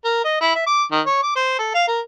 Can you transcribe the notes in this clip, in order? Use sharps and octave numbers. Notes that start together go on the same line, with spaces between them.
A#4
D#5
E4
E5
D6
D#3
C#5
D6
C5
A4
F5
A#4